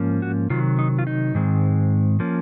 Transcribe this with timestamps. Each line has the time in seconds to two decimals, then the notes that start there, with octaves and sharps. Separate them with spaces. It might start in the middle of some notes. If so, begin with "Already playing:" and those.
Already playing: G#2 F3 A#3 C#4
0.22 F#4
0.50 C3 D#3 F#3 F4
0.79 D#4
0.99 F4
1.07 D#4
1.35 G#2 D#3 G#3 C4
2.20 F3 A#3 C#4